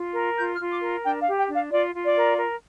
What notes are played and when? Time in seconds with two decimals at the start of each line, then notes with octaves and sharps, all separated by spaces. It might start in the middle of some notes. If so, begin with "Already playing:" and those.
Already playing: F4
0.15 A#4
0.37 F4 G6
0.54 F6
0.60 F4
0.71 D6
0.82 A#4
1.04 D4 G5
1.21 F5
1.27 G4
1.38 G5
1.49 D4
1.54 F5
1.71 F4 D5
1.94 F4
2.05 D5
2.16 A#4
2.38 A#4